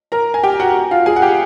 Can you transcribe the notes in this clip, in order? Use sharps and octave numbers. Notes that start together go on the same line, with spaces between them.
A#4 A#5
G#5
G4 G5
F#4 F#5
F4 F5
G#4 G#5
F#5
G4 G5